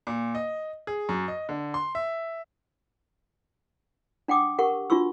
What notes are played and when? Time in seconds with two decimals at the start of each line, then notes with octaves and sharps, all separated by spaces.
0.07 A#2
0.35 D#5
0.87 G#4
1.09 F#2
1.28 D#5
1.49 D3
1.74 C6
1.95 E5
4.28 D4 F#5 G5 D6 D#6
4.58 G4 A#4 F#5 C#6
4.90 D4 F4 F#4 C#6 E6